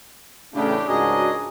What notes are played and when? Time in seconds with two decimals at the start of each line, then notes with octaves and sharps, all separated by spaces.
0.54 A1 A2 C#3 A3 D4 G4
0.88 C#2 G#2 F#4 G#4 A#4 C#5 D#5